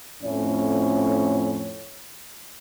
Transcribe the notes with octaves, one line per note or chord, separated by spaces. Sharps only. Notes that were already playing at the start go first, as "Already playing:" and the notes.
F2 A2 C#4 C#5